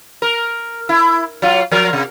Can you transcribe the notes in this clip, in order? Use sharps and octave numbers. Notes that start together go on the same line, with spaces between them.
A#4
E4
F#3 F4
F3 A#4
C3